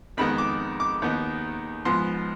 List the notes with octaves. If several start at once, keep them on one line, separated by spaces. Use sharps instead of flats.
F2 D#3 G#3 B3 B5
D6
D6
D#2 D#3 B3 D#4
G#2 F3 B3 C6